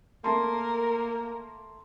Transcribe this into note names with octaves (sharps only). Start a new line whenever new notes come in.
A3 A#3 A#4 A5 C6